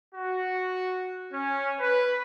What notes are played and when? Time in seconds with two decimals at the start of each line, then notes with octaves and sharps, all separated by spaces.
0.15 F#4
1.32 C#4
1.80 B4